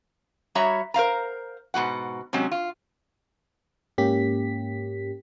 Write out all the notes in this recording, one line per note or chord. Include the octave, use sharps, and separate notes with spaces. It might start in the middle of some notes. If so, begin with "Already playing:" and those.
G3 F#4 C#5 E5 A#5
A#4 C5 F5 A#5
G#2 B2 F#4 F#5
C3 F#3 G#3 C4 C#4
F4
G#2 A#3 C#4 G4 B6